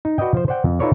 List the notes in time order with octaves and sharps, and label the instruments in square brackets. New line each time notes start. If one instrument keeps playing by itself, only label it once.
[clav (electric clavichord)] D#4
F#4 B4 D5 D#5 G5
F3 C5
C5 D5 F#5 G5
F2
D#4 F4 A4 B4 C#5 D5